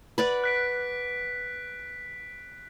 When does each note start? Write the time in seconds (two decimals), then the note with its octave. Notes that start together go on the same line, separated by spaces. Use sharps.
0.18 B4 D5 F#5
0.44 F#6 B6 D7